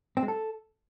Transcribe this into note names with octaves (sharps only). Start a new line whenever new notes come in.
C4
G#3
A4